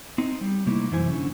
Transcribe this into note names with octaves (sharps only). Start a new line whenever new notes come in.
C4 D#4
G3
C3 A3 A#3 D#4 E4
F#2 E3 E4 C5 G#5
D3 C#4